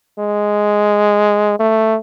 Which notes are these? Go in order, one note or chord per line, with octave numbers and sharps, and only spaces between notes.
G#3
A3